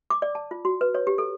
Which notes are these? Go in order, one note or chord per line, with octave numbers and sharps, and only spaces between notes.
D6
D5
A5
F4
F#4
B4
C#5
G4
A4